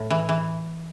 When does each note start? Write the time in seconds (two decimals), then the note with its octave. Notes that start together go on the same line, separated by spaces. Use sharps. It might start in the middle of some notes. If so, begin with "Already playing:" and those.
Already playing: A2
0.10 E3
0.29 E3